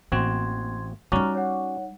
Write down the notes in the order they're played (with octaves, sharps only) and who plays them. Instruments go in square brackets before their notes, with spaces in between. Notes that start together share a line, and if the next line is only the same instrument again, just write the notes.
[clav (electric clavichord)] A1 C4 F#4 [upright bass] A#3 [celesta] C6 G#6
[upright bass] G3 D#4 [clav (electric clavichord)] C#4 F#4 D5 [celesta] A#5 F6
[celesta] C#5 F#5